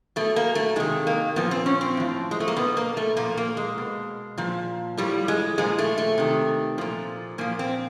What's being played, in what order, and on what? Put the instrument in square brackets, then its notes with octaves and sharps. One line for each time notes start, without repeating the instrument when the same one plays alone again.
[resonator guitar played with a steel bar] B2 A3
A#3
A3
C3 D#3 G#3
A#3
A#2 F3 B3
C4
C#4
C4
A2 F3
G#3
A3
A#3
B2 B3
A#3
A3
A#2 F3 A#3
A#3
G#3
B2
A#2 F3
A2 F3 G3
G#3
A#2 F3 G#3
A3
A3
C3 D#3
A#2 F3
A#2 F3 A#3
C4